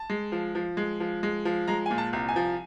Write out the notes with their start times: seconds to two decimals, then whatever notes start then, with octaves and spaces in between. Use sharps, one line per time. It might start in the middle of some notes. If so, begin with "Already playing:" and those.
Already playing: A5
0.10 G#3
0.32 F3
0.55 F3
0.77 G#3
1.00 F3
1.23 G#3
1.45 F3
1.68 G#3 A#5
1.86 A#2 G#5
1.98 A5
2.13 C2
2.29 G#5
2.36 F3